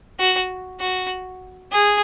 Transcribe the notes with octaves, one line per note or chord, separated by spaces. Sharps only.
F#4
F#4
G#4